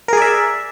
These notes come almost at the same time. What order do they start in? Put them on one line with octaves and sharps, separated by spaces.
A#4 G#4 D5 E5